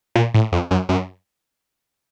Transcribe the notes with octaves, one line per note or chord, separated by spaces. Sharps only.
A#2
A2
F2
F#2
F#2